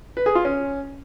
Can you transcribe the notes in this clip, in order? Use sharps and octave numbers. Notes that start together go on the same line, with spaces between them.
B4
G#4
F4
C#4